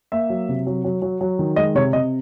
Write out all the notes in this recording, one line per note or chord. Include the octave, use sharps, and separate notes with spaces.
A#3 E5
F#3
C3
F#3
F#3
F#3
F#3
D#3
G#3 D#5
C3 C#5
C3 D#5